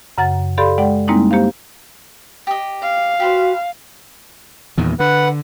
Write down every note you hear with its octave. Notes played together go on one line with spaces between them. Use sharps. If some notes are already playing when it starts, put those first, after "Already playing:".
F#2 C#3 F#5 A#5 A6
G4 A4 D5 F5 B5 C6
G#3 D5 F#5 G5
G3 G#3 A#3 C4 D#4 E4
A#3 G4 C5 F5
G4 D#5
F5
F#4 G4 B4 C5
E2 A#2 D#3
D3 B4 F#5